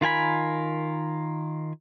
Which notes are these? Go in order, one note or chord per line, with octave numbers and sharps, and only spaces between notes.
D#3 F4 A#4 G#5 B5